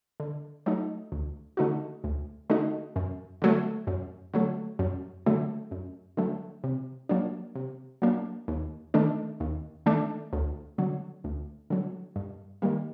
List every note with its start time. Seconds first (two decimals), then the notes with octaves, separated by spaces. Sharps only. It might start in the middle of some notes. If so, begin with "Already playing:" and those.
0.20 D3
0.66 F#3 A3 D#4
1.12 D2
1.57 D3 A3 D#4 F#4
2.04 D2
2.50 D3 A3 D#4 F#4
2.96 F#2
3.42 D3 F#3 A3
3.87 F#2
4.34 D3 F#3 A3
4.79 F#2
5.26 D3 F#3 A3
5.71 F#2
6.17 D3 F#3 A3
6.64 C3
7.09 F#3 A#3 D4
7.55 C3
8.02 F#3 A#3 D4
8.48 D#2
8.94 D#3 A3 D4
9.40 D#2
9.86 D#3 A3 D4
10.33 D2
10.78 D3 F#3
11.24 D2
11.70 D3 F#3
12.16 G2
12.62 D#3 G3 A#3